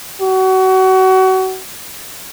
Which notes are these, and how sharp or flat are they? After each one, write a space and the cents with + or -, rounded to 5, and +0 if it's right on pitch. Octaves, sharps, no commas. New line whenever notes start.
F#4 +30